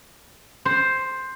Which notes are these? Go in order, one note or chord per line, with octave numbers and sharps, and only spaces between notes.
C5